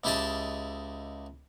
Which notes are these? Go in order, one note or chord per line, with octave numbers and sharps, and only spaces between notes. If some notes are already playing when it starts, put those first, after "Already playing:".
C#2 E4 G4 G#4 D#5 A5